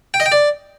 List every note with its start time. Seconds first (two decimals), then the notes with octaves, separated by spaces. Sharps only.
0.14 G5
0.20 D#5
0.26 G5
0.32 D5